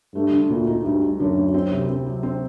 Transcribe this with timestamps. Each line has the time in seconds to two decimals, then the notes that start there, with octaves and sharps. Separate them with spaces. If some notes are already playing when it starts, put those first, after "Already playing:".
0.15 G2 A3
0.32 D3
0.49 D2 A#2
0.67 D#4
0.85 D2 G2
1.02 D#4
1.19 F#2 D3
1.37 D2
1.54 C4
1.71 C3
1.89 C4
2.06 F#3
2.23 C4